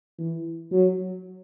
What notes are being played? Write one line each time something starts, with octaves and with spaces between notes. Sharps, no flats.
E3
F#3